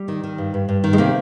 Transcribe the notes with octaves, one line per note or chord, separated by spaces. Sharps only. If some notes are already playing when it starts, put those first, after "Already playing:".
Already playing: G3
D#3
D#3
G2
G2
G2
D#3
G#3
C3 A#3